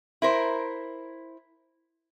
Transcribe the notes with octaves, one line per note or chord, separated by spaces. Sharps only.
E4 A#4 C5